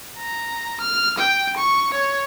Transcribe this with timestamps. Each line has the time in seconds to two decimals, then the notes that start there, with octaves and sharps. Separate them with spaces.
0.18 A#5
0.81 F6
1.19 G5
1.57 C#6
1.94 C#5